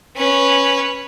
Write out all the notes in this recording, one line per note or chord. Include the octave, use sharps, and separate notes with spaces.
C#4 B4